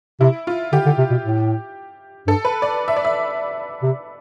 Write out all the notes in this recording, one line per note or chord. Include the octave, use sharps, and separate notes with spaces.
C3 E4
F4
D3 G4
D3
C3
B2
A2
G2 A4
B4
D5
E5
D5
E5
C3